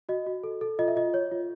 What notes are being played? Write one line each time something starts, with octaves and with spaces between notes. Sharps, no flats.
F#4 D#5
F#4
A4
A4
F4 D#5
E5
F4 D#5
C#5
F4